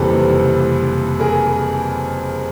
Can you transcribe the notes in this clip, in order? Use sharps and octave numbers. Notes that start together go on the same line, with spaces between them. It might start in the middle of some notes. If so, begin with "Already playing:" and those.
Already playing: F#1 F2 C3 E3 G3 A4 B4
G#4 A#4